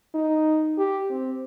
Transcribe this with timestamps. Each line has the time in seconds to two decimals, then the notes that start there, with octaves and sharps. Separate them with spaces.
0.14 D#4
0.78 G4
1.10 C4